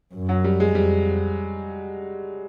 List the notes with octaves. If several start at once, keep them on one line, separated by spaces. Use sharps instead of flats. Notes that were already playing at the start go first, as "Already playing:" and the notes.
F#2
F#3
G3
G#3
F2 G3